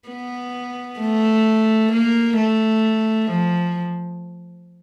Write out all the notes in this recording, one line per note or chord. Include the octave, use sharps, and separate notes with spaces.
B3
A3
A#3
A3
F3